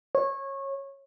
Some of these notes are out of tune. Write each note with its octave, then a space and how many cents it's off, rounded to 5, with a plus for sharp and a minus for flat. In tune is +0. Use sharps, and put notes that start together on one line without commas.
C#5 -20